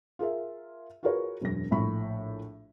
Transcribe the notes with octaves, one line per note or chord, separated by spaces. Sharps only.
F4 G#4 A#4 E5
F4 F#4 G#4 A#4 B4 C#5
E1 F#2 A#6
A#1 A2 B5 C#6